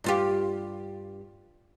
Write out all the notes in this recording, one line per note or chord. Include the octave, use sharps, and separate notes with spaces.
G2 F4 G4